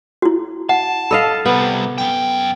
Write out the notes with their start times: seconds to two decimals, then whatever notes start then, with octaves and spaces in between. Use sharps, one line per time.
0.22 E4 F#4
0.69 F#5 A5
1.11 A4 D#5 F5 B5
1.46 C3 G3 B3
1.98 F#2 G5